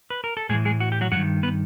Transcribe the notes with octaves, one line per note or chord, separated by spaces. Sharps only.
B4
A#4
A4
A2 E3 G#3 G#4
G#3 G#4
F#4
G4
F#3 F#4
G2 D#3 F#3 F#4
B3 B4